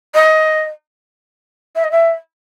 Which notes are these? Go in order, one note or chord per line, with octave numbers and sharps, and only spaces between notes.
D#5
E5
D#5
E5